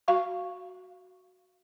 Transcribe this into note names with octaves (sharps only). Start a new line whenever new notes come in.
F#4 F5 C#6